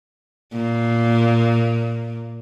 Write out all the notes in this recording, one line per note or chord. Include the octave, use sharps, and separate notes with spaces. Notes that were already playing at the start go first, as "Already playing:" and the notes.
A#2